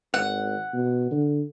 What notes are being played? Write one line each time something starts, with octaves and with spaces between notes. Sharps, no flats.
G#1 F#5
B2
D3